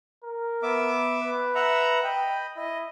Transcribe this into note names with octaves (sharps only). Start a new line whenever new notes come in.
A#4
B3 E5 D6
B4
E5 F#5 A#5
D#5 G5 B5
E4 D#5